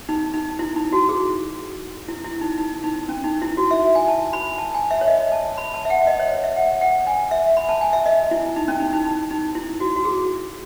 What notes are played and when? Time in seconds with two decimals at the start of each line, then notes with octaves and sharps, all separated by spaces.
0.09 D#4
0.34 D#4
0.59 E4
0.76 D#4
0.92 F#4
1.09 G#4
2.08 E4
2.24 E4
2.41 D#4
2.58 D#4
2.84 D#4
3.09 C#4
3.24 D#4
3.42 E4
3.57 F#4
3.71 E5
3.95 G#5
4.08 A5
4.33 B5
4.58 A5
4.74 G#5
4.91 E5
5.01 C#5
5.08 D#5
5.32 A5
5.57 B5
5.74 A5
5.85 E5
5.90 F#5
6.07 D#5
6.20 C#5
6.32 C#5
6.44 E5
6.56 F#5
6.81 F#5
7.07 G#5
7.31 E5
7.57 B5
7.69 A5
7.81 G#5
7.93 E5
8.06 D#5
8.31 E4
8.56 D#4
8.68 C#4
8.80 D#4
8.93 D#4
9.05 D#4
9.31 D#4
9.55 E4
9.80 F#4
9.96 F#4
10.05 G#4